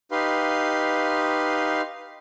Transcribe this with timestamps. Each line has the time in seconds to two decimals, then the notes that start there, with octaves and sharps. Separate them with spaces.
0.11 D#4 G4 B4 F5 C6